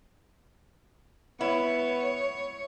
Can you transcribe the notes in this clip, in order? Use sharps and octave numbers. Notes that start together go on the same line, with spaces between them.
B3 E4 C#5